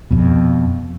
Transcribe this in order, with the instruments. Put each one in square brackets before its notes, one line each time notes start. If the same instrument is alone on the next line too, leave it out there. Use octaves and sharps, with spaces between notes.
[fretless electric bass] F2 B2